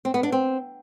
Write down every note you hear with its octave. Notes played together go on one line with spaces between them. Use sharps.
C4
B3
D4
C4